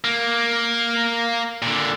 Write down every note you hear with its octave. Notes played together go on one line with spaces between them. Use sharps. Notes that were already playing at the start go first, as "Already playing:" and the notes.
A#3
A#2 D3